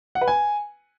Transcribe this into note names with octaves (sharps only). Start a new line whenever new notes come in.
F#5
B4
G#5